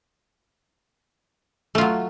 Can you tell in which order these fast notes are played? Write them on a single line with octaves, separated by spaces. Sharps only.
A3 F4 F#3